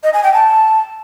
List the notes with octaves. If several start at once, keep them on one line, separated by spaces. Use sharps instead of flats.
D#5
G#5
G5
A5